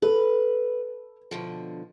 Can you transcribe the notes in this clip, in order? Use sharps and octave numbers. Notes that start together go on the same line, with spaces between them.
A4 B4
B2 D3 F3